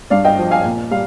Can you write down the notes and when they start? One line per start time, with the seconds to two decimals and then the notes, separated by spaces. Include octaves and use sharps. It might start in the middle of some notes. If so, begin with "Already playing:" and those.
0.10 G2 D5 F5
0.25 D#5 G5
0.38 F3
0.51 F5 G#5
0.65 A#2
0.91 G3 F5